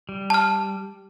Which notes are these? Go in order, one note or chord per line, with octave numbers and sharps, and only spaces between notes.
G3
A5 F6